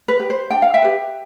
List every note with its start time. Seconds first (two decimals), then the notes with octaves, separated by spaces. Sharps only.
0.08 B4
0.19 G4 B4
0.30 C5
0.50 D4 G5
0.62 F5
0.74 E5 G5
0.82 G4 B4